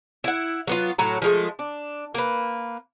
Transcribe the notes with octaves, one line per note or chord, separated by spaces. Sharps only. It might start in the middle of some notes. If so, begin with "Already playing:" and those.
E4 F#5
F#3 B3 F4
A2 F#3 A#5
F3 G#3 A3
D4
A#3 B4